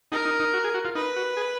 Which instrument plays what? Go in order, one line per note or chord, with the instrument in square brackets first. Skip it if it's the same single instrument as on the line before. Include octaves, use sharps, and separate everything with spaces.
[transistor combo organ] D#4 [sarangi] A#4
[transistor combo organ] D#4
D#4
F#4
G#4
F#4
F4
[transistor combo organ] D#4 [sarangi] B4
[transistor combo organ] F#4
G#4